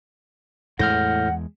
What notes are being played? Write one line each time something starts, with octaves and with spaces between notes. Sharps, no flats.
E2 A2 G#3 F#5 F6 G6 A#6